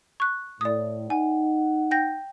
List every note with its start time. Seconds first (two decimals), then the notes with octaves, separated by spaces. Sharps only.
0.20 C#6 F#6
0.61 A2 D5 D#6
1.10 D#4 F#5 G#5
1.91 G5 G6 A#6